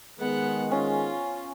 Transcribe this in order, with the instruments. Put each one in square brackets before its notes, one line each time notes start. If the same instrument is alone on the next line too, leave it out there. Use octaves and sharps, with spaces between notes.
[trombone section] D#3 G#3 G#4 [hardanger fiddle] B3 F#5
[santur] C#4 [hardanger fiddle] F4